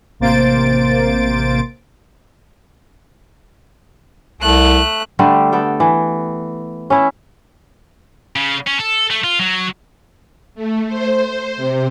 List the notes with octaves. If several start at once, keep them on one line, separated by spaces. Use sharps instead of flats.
A1 C3 A#3 C5 A6 D7
C2 A3 F#6
D3 G3 A3 G4
B3 A4 G5
E3
C#4 E4
C#3
C#4
A4
A3
F4
F#3
A3
C5
C3